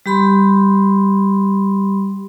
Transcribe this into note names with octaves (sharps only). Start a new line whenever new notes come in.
G3 G4 B5 C6